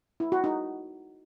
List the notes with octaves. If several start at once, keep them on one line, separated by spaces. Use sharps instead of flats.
E4
F#4
D#4